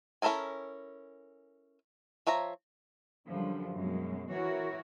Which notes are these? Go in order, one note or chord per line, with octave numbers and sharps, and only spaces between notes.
C#4 E4 A4 A#4 G#5
F3 C#5 E5 A#5
F#2 D3 F3 G3
F#2 B2 G#3
E3 E4 F#4 A#4 C#5